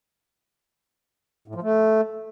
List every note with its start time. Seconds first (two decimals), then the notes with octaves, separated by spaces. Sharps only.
1.48 A2
1.55 F3
1.62 A3